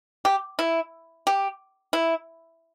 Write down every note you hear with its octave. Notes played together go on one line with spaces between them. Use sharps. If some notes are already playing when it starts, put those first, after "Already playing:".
G4
E4
G4
E4